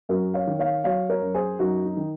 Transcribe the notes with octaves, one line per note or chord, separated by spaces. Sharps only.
F#2 F#4 A#4
C#5 F5
D#3
C#5 F5
F#3 C#5 F5
A#4 C#5
F#2
G#4 C5
F#2 D#4 F#4
D#4
D#3